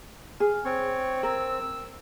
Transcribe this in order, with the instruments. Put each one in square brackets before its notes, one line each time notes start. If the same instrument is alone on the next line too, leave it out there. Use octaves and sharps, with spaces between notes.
[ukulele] G#4 [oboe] F5
[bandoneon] C4 [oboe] C#5
[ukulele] A#4 [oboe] E6